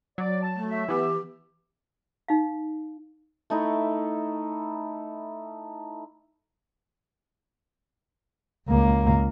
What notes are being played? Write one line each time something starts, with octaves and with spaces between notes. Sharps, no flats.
F#3 D5
A5
A3
E5
E3 B3 G4
D#4 F5
A3 D#4 E4
C#2 A#3